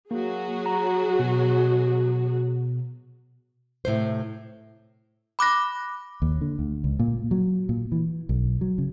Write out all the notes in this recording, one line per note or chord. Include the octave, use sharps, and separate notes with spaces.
F#3 A#3 F#4 G#4
A#5
B2
A2 C3 C5
B5 D6 F#6 A#6
D#2
D3
D2
C#2
A#2
F#3
A#2
E3
B1
F#3
C#3